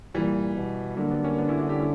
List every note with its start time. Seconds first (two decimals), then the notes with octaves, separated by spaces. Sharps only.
0.14 A#2 E3 G3
0.56 B2
0.97 D3 F#3 A#3
1.11 G3 B3
1.24 A#3 C#4
1.38 B3 D4
1.48 C#4 E4
1.59 D4 F#4
1.69 E4 G4
1.79 C#4 E4